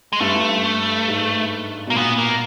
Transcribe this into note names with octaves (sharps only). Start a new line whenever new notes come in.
G#3
G2 A3
G2
G#2
B2 A#3
A#2 B3
A#3